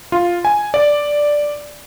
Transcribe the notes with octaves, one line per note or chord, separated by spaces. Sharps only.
F4
G#5
D5